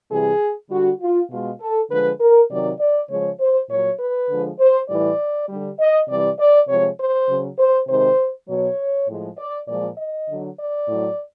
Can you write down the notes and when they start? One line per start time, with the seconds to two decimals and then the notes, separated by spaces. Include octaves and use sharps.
0.11 C3 E3 G3 G#4
0.70 D3 G3 F#4
1.01 F4
1.30 B2 G#3 F4
1.60 A4
1.90 D3 F3 G#3 B4
2.20 A#4
2.50 C3 D#3 F#3 D5
2.79 D5
3.10 C#3 F3 G#3 C#5
3.40 C5
3.69 A#2 F#3 C#5
4.00 B4
4.29 D3 F3 G#3
4.59 C5
4.89 A2 E3 G3 D5
5.49 D3 G3
5.79 D#5
6.09 C3 E3 G3 D5
6.39 D5
6.68 C3 F3 G#3 C#5
6.99 C5
7.29 C#3 F#3
7.58 C5
7.88 C3 D#3 G#3 C5
8.48 B2 F#3 C#5
9.08 A2 F3 G#3
9.38 D5
9.68 A#2 F3 G#3 D5
9.97 D#5
10.28 D3 F#3
10.57 D5
10.87 A2 F#3